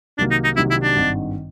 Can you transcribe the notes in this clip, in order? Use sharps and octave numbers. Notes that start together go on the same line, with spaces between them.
C2 C3 D#3 F#3 A#3 D4
D#4
D#4
C2 C3 D#3 F#3 A#3 E4
E4
D4
G#1 G2 D#3